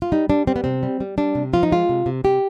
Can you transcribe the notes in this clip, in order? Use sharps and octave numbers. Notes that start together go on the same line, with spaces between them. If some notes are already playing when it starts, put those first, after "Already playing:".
F4
G3 D#4
G3 D4
G3 C4
B3
C3 C4
G3
G3
G3 D4
C3
F3 F4
D#4
G#3 F4
C3
C3
C3 G4